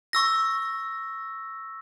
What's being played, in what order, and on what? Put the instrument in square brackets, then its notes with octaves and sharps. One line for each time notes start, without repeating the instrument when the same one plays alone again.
[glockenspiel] C#6 E6 A#6